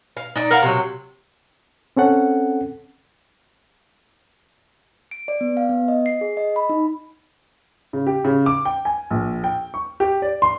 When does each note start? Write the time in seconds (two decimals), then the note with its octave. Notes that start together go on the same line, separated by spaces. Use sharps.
0.17 F5
0.36 D#4 D5
0.50 A#4 F5 F#5 A#5
0.63 C3 F#3
1.97 C4 C#4 A4 F#5
5.11 D7
5.28 D5
5.41 B3
5.57 F5
5.69 B3
5.88 D#5
6.06 C7
6.21 G#4
6.37 D#5
6.56 B5
6.69 D#4
7.93 C#3
8.07 G4
8.24 C#3
8.46 D6
8.65 G5
8.85 G#5
9.11 A#1
9.44 G5
9.74 C#6
10.00 G4
10.22 D5
10.42 C6